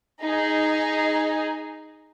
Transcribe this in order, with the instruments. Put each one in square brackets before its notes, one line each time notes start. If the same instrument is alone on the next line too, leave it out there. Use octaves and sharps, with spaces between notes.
[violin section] D#4 G#4